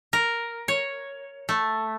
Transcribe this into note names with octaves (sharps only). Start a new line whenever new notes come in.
A#4
C#5
A3